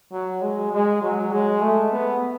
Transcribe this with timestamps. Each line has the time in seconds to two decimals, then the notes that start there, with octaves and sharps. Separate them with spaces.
0.12 F#3
0.42 G#3
0.73 G#3
1.02 F#3
1.32 G#3
1.62 A3
1.92 B3